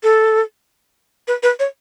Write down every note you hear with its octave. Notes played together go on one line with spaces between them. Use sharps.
A4
B4
B4
C#5